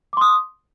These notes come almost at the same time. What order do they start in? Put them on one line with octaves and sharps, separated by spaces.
D6 C6 D#6